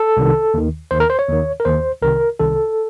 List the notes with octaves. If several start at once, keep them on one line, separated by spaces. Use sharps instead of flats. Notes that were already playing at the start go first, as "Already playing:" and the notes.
Already playing: A4
C2 C3 D#3
D#2 D#3
D#2 D#3 C5
A#4
C5
C#5
D#2 D#3
A#4
D#2 D#3 C5
C2 C3 D#3 A#4
C2 C3 D#3 A4